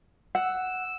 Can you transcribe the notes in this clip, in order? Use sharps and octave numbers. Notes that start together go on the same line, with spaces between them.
F#5 E6